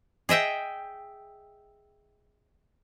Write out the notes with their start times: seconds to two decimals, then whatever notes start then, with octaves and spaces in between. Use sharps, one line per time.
0.29 G#4 D#5 E5 G5